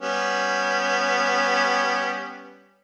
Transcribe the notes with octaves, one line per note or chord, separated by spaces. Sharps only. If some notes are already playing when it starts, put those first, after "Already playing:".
G3 B3 C#4